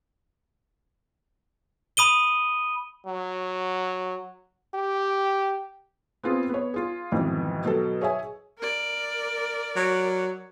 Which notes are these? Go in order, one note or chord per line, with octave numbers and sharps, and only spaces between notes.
B5 D#6 D#7 G7
F#3
G4
B3 C4 F4 G#4
B3 C#5
F4 G#4
F2 G#2 B2 D#3 E3
B2 F#3 A4
G#4 C#5 E5 G#5
A#4 D5
F#3